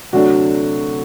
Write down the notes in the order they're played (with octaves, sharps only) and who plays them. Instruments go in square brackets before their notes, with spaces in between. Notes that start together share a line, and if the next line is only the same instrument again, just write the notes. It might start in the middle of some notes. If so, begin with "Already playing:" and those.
[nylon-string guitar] D2 C3 F#3 A3 D4 [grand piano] F#4